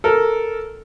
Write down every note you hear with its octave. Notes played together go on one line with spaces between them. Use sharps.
A4 A#4